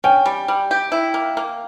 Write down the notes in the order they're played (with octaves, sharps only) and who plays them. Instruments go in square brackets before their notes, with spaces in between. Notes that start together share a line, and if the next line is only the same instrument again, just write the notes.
[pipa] C#4 [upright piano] G5
[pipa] G3
G3
G4
E4
A#3
A#3